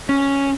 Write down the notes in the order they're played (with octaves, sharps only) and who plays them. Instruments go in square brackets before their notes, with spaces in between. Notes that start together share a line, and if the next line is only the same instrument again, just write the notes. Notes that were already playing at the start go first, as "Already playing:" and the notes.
[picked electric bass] C#4